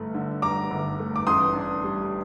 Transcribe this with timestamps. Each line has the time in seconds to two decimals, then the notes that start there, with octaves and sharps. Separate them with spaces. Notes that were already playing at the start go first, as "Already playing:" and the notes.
Already playing: G1 A3
0.14 D3
0.42 G2 A#5 D6
0.71 G1
1.00 A3
1.16 D6
1.27 A1 C6 D#6
1.55 D4
1.84 G3